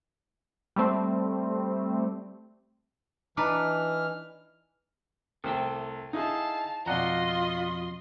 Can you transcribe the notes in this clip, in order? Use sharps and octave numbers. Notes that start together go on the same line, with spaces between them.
G3 A3 C4
E3 D4 D#4 B4 F6
C2 A3 A4 C5 G5
D#4 E4 G#4 F5 A5
F2 B2 F4 D5 D#5 F#5 A#5 C6